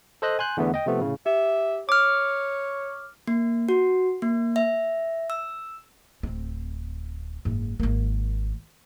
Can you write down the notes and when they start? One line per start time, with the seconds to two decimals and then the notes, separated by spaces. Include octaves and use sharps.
0.22 A4 C5 D#5 F#6
0.39 G#5 C6 F#6 G6
0.57 E2 D3 A3 B3
0.74 D#5 G5
0.86 C3 F3 A3 B3
1.00 A2 C#3
1.26 G4 E5
1.89 C#5 D6 F6
3.28 A#3
3.69 F#4
4.22 A#3
4.56 E5
5.30 E6
6.23 D1 C4
7.45 F#1 G#2
7.80 G#1 A#3